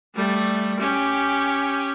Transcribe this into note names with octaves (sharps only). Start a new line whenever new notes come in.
G3 A3
C#4 G4